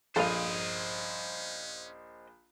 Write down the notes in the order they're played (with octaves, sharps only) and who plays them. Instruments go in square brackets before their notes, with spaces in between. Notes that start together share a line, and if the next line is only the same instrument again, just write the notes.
[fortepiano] A#1 [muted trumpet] C#4 [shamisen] A4 F5 [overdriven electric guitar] C5 D#5